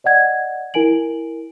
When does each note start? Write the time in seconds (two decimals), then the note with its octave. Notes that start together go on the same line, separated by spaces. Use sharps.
0.04 D5 D#5 F#5 G#6
0.74 E4 A#4 G#5 D7 F#7